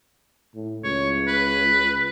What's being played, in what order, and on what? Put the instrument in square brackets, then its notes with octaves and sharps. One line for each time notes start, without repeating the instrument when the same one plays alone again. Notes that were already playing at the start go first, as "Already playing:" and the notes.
[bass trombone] A2
[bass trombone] C#2 [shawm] C#5
[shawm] B4